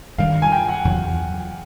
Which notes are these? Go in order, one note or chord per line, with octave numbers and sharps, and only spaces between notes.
G2 D#3 G3 F5
G#5
G5
F#5
E2 C#3 F#3